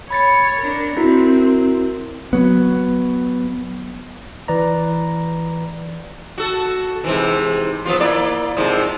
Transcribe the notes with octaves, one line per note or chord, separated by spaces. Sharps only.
C#5 B5 A6 C#7
D4 A#4
C4 E4 F#4 A#4
F#3 B3
E3 B4 D5 A#5
F#4 A4
G#2 C3 E3
F3 B3 F4
A#3 E4 D5
G#2 C3 F3